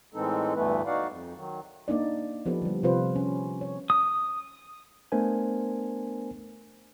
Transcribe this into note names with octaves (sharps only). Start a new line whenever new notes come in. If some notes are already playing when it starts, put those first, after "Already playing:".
A2 E3 G#3 C4 D#4 A4
D2 G2 E3 A3 B3 B4
D#4 F#4 D5 F5 F#5
F2
D#3 F#3
A#3 D4 D#4 D5
F3 B3 G4 A4 B4
D3 G3
C3 F3 C4 F4 B4 C5
C#4
C#5
D#6
A3 B3 D4 A#4 C5 G#5